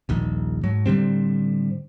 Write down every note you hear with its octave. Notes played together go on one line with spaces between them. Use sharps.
D#1 A#1 D#3
G#2 F#3
A2 D3 G3 C4